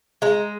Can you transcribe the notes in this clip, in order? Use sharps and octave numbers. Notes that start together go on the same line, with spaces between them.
G#3 A#5